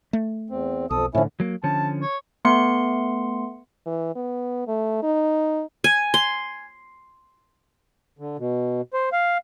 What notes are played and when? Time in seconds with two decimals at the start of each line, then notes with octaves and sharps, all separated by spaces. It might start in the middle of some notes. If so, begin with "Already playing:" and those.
0.13 A3
0.50 E2 C4
0.90 B1 F2 A4 D#6
1.15 A2 D3 F3 C#4 E4
1.40 F#3 A#3
1.64 D3 F3 C#4 A5
2.02 C#5
2.45 A3 B3 C6 C#7
3.86 E3
4.15 B3
4.67 A3
5.03 D#4
5.84 G#5
6.14 C6
8.19 D3
8.39 B2
8.94 C5
9.13 F5